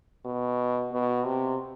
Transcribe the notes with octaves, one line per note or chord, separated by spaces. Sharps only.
B2
B2
C3